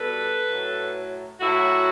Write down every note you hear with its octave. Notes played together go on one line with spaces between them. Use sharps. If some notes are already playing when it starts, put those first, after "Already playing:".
Already playing: B2 G3 A4 B4
A2 F#3
A2 F#3 E4 F#4